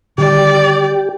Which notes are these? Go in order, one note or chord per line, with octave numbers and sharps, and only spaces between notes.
D3 D#3 G3 G4 D5